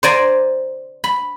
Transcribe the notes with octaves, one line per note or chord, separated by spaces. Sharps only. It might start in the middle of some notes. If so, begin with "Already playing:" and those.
C5 D5 G#5 A#5
B5